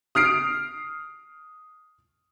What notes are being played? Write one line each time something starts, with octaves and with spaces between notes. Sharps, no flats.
D#6 F6 C7 D7